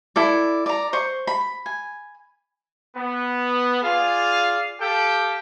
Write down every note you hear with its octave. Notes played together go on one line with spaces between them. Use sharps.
E4 A4 D5
D5 A#5
C5 C#6
B5
G#5
B3
F4 G#4 D5 F5
G4 A4 F5 G5